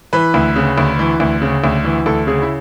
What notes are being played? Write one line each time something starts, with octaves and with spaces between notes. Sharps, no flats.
E3 B4
D2
C#3
D2
E3
D2
C#3
D2
E3
D2 A4
C#3 G#4
E4